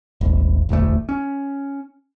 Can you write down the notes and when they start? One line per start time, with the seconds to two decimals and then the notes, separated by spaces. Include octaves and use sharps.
0.21 D#1 G#1
0.69 E1 A1 D2 A3
1.09 C#4